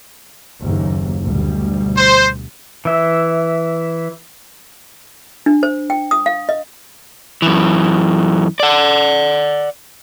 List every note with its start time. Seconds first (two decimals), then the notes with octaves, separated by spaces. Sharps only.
0.61 F#1 D#2
1.25 D2 B2 G3
1.97 C5
2.85 E3 E5
5.46 D4
5.63 C5
5.90 G5
6.11 D#6
6.26 F5
6.49 D#5
7.42 F#2 E3
8.60 D5 F#5